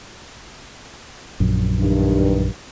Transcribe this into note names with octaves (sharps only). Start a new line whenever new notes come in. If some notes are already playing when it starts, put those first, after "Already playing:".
A#1 F#2
G2 D#3